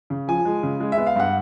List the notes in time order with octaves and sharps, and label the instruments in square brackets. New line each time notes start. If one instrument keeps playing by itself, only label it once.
[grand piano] C#3
F3 G#5
G#3
C#3
G#3
E5
B3
F5
G2 F#5